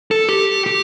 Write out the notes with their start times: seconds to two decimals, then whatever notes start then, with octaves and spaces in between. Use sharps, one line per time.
0.11 A4
0.29 G4
0.66 G4